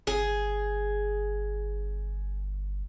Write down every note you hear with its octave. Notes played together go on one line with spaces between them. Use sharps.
G1 G#4